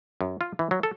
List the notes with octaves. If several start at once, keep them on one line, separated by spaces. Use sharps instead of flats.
F#2
F4
E3
F#3
A4